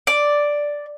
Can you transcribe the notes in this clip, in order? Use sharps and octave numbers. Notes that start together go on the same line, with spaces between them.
D5